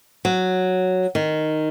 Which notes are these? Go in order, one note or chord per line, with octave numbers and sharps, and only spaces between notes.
F#3
D#3